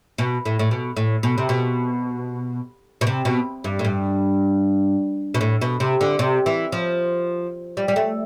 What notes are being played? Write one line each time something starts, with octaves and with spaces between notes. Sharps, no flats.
B2
A2
A2
B2
A2
B2
C3
B2
B2
C3
B2
G2
A2
G2
B2
A2
B2
C3
D3
C3
E3
F3
G3
G3
A3